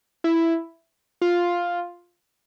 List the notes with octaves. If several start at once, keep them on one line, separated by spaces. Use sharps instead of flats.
E4
F4